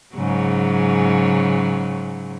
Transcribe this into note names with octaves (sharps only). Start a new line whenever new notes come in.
G#2 C#3 F#3